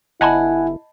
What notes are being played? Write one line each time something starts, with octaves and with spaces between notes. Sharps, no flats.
G1 E4 D#5 F#5 G#5 A5 B5